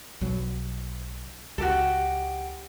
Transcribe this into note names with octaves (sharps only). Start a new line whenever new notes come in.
B1 B2 F#3
C#2 F#4 G4 A4